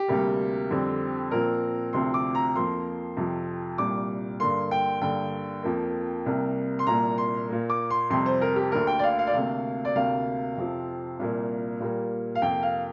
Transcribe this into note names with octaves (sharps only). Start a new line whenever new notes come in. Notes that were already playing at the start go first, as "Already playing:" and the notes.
Already playing: G4
D2 C3 G3 A#3
F2 D3 G3 C4
A#2 F3 C4 A#4
D2 C3 F3 C4 C6
D6
A#5
F2 F3 A#3 C6
F2 C3 F3
C2 A#2 G3 D6
G2 D3 A#3 C6
G5
G2 D3 A#3 G5
F2 F3 A#3
C2 C3 A#3
C6
C2 A#2 A#3 A#5
C6
A#2 A#3
D6
C6
F2 C3 G3 C6
C5
A#4
G4
D2 D3 A#3 A#4
G5
D5
F5
F5
D5
D2 C3 A#3 F5
D5
D2 C3 A#3 F5
F2 C3 F3 C4
C2 A#2 A#3
A#2 G3 A#3
F5
F2 C3 A#3 G5
F5